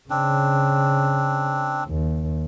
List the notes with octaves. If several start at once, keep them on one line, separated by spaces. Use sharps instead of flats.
C#3 C4 D4
D#2